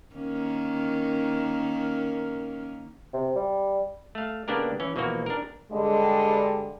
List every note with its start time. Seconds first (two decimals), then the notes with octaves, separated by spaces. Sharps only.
0.16 D#3 A#3 C#4
3.13 C3
3.36 G3
4.15 A3 F5
4.48 C#3 A#3 B3 D4 G4 A#4
4.80 E3 C#4
4.96 B2 E3 F3 A#3 F#4
5.26 D4 A#4
5.72 G2 D3 G3 G#3